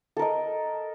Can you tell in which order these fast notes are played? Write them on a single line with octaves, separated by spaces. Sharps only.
A4 A#4 D#5